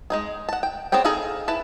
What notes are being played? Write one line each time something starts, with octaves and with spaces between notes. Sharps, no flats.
G#3 D#4 G#4
F#5 A5
G5
B3 C4 G#4 C#5 G5
D#4 G#4 A4 D#5 F5
E4 B4 G#5 A5 B5